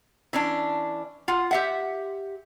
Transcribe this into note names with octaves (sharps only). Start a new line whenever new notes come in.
E3 C#4 D4
F4 F#5
G4 E5 F#5